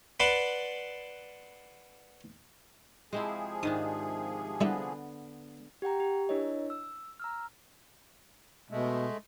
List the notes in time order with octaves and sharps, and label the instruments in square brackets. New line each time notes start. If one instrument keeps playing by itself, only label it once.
[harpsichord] B4 D5 F#5 A5 B5 C6
[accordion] C3 F3 G#4 [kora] G#3 C4 E4
[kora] G#2 D#3 D4 [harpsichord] D#6
[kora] D3 B3 [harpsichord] G3 E4 G4
[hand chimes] G4 F#5 G5 A#5
G4
D4 E4 A#4 C#5 D#5
E6
A#5 E6 F6
[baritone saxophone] B2 [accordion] G#3 A3